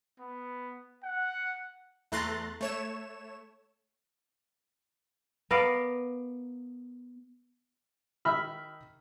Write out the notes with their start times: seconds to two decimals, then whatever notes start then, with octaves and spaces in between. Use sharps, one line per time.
0.20 B3
1.04 F#5
2.12 E2 A3 A#5 C6 F#6 A6
2.61 A3 C#5 E7
5.51 B3 A#4 D5 F5
8.25 D#3 E5 B5 F6